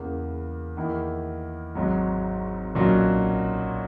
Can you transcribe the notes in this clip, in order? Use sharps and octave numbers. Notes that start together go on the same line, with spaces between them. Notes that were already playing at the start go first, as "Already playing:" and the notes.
Already playing: E2 C#3 E3 A#3
E2 D#3 A#3 E4
G#1 G#2 F#3
B1 A#2 F#3 C#4 F#4